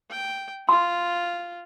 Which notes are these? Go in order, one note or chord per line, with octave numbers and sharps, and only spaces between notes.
G5
F4 C6